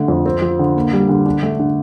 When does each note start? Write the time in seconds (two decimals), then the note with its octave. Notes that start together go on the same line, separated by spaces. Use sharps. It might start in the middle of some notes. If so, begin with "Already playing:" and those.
Already playing: D3 A3
0.08 F2
0.26 C4
0.42 F3
0.59 D3
0.76 A#3
0.93 G3
1.09 D3
1.26 D4
1.43 A3
1.59 D3